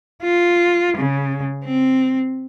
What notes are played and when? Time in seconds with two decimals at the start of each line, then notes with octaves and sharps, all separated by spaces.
0.22 F4
0.97 C#3
1.64 C4